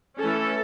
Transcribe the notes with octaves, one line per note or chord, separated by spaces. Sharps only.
E3 A3 C#4 A4